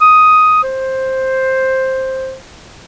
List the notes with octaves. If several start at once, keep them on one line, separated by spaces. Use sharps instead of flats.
D#6
C5